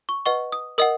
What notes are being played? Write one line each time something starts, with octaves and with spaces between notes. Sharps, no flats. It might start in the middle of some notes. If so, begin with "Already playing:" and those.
C#6
B4 D#5 F#5 C#6
D#6
A#4 D#5 F#5 D#6